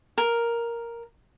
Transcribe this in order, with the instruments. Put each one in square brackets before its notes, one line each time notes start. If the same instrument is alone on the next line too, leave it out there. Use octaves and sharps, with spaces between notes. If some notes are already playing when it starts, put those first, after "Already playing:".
[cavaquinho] A#4